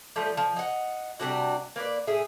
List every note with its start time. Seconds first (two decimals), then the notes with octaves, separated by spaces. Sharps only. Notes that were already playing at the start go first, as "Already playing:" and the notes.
0.16 F3 G3 A3 A4
0.37 F3
0.56 D#4 F#5
1.20 C3 G3 D4 F#4
1.76 A#3 B4 D5
2.07 A2 E4 G#4